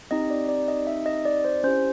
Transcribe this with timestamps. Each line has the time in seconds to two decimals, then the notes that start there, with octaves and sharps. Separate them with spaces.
0.11 C4 D#4 G4 D#5
0.30 D5
0.49 D5
0.68 D#5
0.87 E5
1.06 D#5
1.25 D5
1.45 C5
1.64 C#4 E4 G4 C5